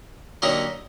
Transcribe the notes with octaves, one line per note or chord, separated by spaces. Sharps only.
D3 F#3 A#3 D#4 G4